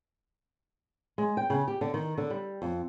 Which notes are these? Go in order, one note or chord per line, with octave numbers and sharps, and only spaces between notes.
G#3
G5
C#3
G4
D3
D#3
D3
G3
F2